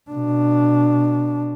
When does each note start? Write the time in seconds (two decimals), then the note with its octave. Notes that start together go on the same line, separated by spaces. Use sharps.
0.11 B2 D4